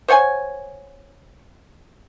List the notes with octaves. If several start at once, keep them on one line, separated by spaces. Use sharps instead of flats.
C5 C#5 F#5 G#5